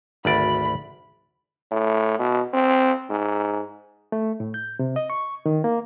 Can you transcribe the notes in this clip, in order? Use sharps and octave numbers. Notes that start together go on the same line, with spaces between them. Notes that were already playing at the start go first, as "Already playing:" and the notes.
G#1 D2 D5 B5
A2
B2
C4
G#2
A3
A2
G6
C3
D#5
C#6
D#3
A#3